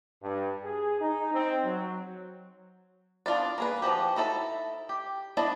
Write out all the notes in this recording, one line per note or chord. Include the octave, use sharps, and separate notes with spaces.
G2
G#4
D#4
C4
F#3
B3 D4 F4 B4 D5
A#3 G#4 B4
F3 C#4 F#4 G4
D#4 E4 A4 D#5 E5
G4
B3 D4 E4 D5 D#5